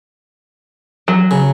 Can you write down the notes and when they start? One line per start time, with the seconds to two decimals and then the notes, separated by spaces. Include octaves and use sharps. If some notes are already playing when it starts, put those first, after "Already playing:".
1.08 F#3
1.31 C#3